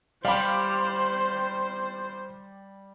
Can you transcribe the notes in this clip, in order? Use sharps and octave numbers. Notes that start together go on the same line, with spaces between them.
G3 G4 C5 F5 B5